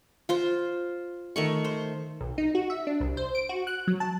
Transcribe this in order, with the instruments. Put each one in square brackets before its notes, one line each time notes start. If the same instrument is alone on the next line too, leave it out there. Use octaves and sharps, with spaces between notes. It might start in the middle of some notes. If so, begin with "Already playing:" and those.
[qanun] F4 C5
D#3 A3 C#6
C5
[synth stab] B1
D#4
F#4
E5
D4
C2
C5
D7
F#4
F#6
F#3
A5